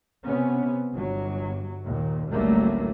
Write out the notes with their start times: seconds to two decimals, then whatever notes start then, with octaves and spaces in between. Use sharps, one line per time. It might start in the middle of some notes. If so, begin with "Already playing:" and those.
0.25 C3 B3 C#4
0.91 G1 F#3
1.83 D#2 A#2
2.31 A1 D2 F#3 G3 A3 A#3